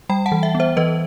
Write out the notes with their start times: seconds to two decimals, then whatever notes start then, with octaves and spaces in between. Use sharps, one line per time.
0.10 G3 G5 B5
0.26 F#5 A5
0.32 E3
0.43 E5 G5
0.55 B3
0.60 C5 E5
0.77 E3 B4 D#5